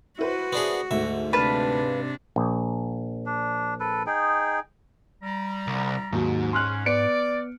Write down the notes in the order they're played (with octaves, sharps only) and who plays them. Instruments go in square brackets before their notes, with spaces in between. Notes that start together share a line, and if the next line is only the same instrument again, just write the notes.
[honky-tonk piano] E4 B4 C5 [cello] F#4
[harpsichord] B3 D4 G#4
[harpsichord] D2 E5 [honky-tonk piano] G#2
[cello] C3 D4 [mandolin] B4 F5 A5
[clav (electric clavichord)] A#1
[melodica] D4
A4 B4
D#4 G#4 G5
[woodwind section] G3 A#5
[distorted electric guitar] C2
[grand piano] D#2 F#3 [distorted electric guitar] G#2
[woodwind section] C#4 [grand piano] C6 F6 F#6
[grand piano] B3 C#7 D7 [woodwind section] D5